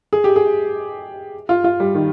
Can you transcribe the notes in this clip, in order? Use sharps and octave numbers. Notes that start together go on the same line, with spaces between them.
G#4
G4
G#4
F4
F4
G3
D#3